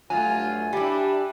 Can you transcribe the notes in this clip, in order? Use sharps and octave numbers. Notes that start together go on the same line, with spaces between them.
G2 F#3 A3 F4 G#5
G3 D4 E4 G4